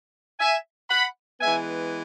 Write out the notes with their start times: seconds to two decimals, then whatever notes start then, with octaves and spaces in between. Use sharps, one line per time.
0.39 E5 G#5
0.89 F#5 B5
1.40 E3 G#3 B3 E5 G#5